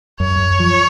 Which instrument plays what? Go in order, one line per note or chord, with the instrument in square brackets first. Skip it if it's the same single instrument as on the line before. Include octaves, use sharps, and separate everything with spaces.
[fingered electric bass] F#2 [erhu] C#5
[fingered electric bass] F#2
F3